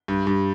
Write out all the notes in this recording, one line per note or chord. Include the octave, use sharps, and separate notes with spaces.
G2
G2